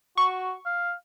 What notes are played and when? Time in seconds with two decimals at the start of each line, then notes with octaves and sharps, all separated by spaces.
0.17 F#4 C#6
0.66 F5